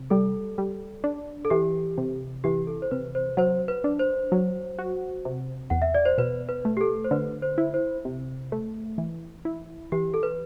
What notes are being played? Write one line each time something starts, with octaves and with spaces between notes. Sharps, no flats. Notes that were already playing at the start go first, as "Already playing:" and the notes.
Already playing: C3
G3 A4
G3
D4
A4
E3 G4
C3
E3 G4
A4
C5
C3 B4
C5
F#3 C5
B4
D4
C5
F#3
F#4
C3
E2 F#5
E5
D5
C5
B2 B4
B4
A3
G4
A4
C5
D3 B4
C5
E4
C5
C3
A3
E3
E4
E3 G4
A4
B4